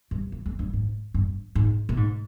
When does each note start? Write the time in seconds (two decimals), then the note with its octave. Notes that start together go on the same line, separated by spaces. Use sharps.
0.11 G2
0.32 F2
0.46 F2
0.59 G2
0.73 G#2
1.14 G2
1.55 G#2
1.89 A#2
1.97 G#2